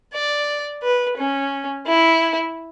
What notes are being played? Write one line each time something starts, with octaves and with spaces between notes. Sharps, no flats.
D5
B4
C#4
E4